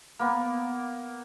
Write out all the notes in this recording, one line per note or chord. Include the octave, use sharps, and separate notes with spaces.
A#3 B3